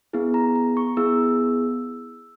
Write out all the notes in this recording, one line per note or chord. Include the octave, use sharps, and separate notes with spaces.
B3 E4 G#4
A#5
A#5
C#6
B3 E4 G#4 E6